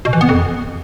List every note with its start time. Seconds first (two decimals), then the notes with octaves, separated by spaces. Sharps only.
0.05 B2
0.13 E3
0.21 B3
0.29 F2